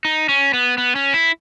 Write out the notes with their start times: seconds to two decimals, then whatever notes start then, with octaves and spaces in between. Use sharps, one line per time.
0.05 D#4
0.29 C#4
0.53 B3
0.78 B3
0.95 C#4
1.14 E4